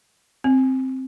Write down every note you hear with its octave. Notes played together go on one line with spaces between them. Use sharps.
C4